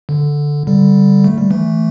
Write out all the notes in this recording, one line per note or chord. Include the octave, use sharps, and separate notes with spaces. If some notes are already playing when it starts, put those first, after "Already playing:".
D3
D3 G3
A3
G3
E3 A3